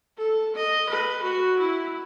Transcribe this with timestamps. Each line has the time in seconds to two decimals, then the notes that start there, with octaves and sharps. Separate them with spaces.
0.17 A4
0.56 D#5
0.89 B4
1.22 F#4
1.59 E4